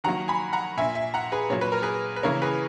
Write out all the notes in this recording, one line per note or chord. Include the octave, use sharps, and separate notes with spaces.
D#3 F#3 A#3 F#5 A#5
G#5 B5
F#5 A#5
A#2 A#3 E5 G#5
E5 G#5
F#5 A#5
G#4 B4
A#2 F#3 A#3 C#5
B4
A#4
G#4 B4
B4
C#3 E3 A#3 A#4 C#5
G#4 B4